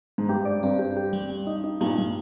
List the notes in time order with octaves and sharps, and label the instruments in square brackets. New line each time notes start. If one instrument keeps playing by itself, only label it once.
[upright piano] G#2
[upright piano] G2 [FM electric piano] G4
[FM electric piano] D5
[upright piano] G2 [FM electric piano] C4
[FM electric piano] G4
G4
G3
G3
D#4
D#4
[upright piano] G2 A#2 [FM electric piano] G3
[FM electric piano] G3